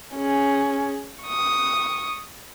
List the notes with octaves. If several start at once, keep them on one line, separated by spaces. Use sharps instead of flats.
C#4 G#4
C#6 D#6